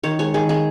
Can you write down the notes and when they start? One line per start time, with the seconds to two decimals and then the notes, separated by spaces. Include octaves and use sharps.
0.03 D#3 C#5
0.19 G#3 C#5
0.34 D#3 G#4
0.49 G#3 G#4